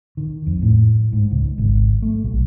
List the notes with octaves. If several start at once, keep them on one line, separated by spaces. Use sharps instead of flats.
D#3
F2
A2
G#2
C#2
G#1
A3
B1